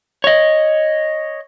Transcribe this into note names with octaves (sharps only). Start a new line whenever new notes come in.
C#5 D#5